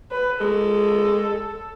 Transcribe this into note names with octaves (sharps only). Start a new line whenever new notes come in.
B4
G#3 A4